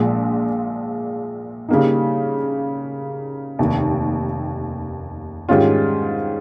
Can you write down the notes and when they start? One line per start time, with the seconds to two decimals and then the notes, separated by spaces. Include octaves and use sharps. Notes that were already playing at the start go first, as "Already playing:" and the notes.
Already playing: A#1 A#2 F3 G#3
1.69 C#3 G3 A#3 D#4
3.59 F1 D#2 D#3
5.49 G#2 D#3 G3 C#4 F4